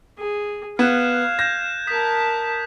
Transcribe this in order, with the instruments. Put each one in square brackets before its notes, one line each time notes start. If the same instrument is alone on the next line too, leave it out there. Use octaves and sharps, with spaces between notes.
[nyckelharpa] G#4
[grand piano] B3 [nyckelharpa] F5 [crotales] F#6 G#6 E7
[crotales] G6 G#6 E7 [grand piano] A#6
[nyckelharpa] A#4 A5 [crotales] D#6 B6